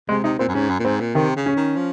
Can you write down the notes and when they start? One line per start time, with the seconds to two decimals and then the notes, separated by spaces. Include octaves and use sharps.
0.09 C3 G#3
0.24 C3 D#4
0.39 A#2 C4
0.48 F#2
0.54 G#2 C#4
0.70 F#2
0.79 A#2
0.85 G#2 C4
1.00 A#2
1.15 C3 D#3
1.36 C#3
1.46 C#4
1.56 D#3
1.77 F3